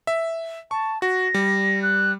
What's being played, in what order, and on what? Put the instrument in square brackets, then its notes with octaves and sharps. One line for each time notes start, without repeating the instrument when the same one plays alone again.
[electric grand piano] E5
[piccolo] A5 [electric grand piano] C#6
[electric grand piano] F#4 [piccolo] A#6
[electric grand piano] G3
[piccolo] F#6